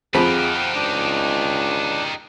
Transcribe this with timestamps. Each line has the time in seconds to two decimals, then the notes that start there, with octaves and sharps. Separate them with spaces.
0.14 F2 F3 D#4 G4 G#4 F5 F#5 B5
0.74 C#2 D4